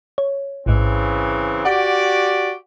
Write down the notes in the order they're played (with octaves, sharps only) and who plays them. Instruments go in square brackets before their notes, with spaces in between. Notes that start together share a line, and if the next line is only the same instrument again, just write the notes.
[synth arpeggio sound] C#5
[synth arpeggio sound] A1 G#2 [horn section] C#3 E3 C4
[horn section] F#4 G4 D5 [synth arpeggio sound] F#5